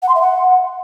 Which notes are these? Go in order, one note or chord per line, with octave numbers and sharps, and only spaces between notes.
F#5
C6
E5
F#5